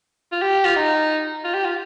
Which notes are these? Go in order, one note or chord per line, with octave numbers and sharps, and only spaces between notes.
F4
G4
F4
D#4
F4
G4
F4